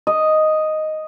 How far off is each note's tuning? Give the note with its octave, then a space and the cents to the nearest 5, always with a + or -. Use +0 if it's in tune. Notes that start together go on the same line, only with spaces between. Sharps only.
D#5 +0